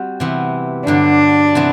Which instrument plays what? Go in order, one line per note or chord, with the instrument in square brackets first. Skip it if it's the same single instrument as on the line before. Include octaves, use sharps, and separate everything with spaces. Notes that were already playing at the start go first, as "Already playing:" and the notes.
Already playing: [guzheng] G3 C4 F#4
C3 E3 B3
[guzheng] G2 D3 F#3 [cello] D4
[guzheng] C3 E3 B3 E4